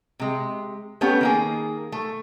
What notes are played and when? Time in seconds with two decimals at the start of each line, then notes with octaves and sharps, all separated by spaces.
0.19 C3 G#3
1.01 A3 B3 C#4 G4
1.21 D#3 A#3 G#4
1.92 A3